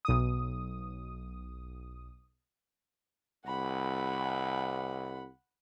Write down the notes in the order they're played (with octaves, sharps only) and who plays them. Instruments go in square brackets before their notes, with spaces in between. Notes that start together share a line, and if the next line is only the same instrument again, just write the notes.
[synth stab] B1 D#6
[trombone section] C2 [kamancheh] F#5 B5